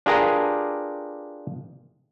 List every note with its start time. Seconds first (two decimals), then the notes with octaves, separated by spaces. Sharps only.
0.06 D4 F4 G4 G#4 A#4 B4